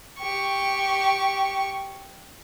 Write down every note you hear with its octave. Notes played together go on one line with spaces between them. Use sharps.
G4 C#6